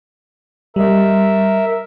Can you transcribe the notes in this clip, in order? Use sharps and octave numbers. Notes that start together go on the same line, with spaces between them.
G3 A#4 D#5 E5